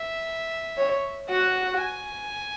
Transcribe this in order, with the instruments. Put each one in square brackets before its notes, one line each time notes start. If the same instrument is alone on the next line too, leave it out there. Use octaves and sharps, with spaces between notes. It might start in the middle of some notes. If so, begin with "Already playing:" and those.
Already playing: [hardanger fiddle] E5
[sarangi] C#5
[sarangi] F#4 [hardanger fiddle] F#5
[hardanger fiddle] G#5